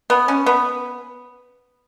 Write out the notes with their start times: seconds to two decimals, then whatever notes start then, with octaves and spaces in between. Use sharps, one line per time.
0.10 B3
0.28 C#4
0.46 B3